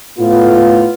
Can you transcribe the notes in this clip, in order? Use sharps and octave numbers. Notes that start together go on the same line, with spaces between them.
A2 B3 F4